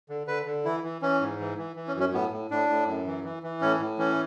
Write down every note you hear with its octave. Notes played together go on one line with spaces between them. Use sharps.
D3
D3 B4
D3
E3 E4
E3
E3 C#4
G#2
E3
E3
E3
C#4
F#2
C#4
A2 B3
A2
A2 D4
A2
F#2
E3
E3
E3
A2 C#4
A2
E3 C#4